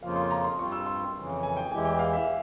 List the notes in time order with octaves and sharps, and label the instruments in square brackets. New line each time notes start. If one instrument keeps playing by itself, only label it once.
[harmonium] F2 C#3 F3 A#3 F4 [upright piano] F5
[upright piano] C6
A#5
C6
[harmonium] G2 G3 C4 F4 [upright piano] C#6
[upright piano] E6
C6
[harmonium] F2 C#3 E3
[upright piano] G#5
G5
[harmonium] E2 E3 G#3 E4 G4 [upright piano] G#5
[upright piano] G5
F5
E5